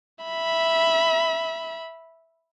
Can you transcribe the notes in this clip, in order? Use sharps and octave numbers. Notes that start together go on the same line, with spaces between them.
E5 B5